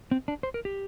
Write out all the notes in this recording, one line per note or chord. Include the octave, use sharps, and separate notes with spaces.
C4
D4
C5
A#4
G4